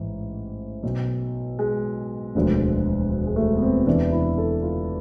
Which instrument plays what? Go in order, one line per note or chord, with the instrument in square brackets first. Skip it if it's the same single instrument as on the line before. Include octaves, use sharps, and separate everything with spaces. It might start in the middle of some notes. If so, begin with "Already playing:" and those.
Already playing: [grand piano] A1 G#2 E3
B1 B2
G#3
E1 D2 D3 F3
G#3
A3
B3
C4
E2 C3 E3 D4
E4
A4
F4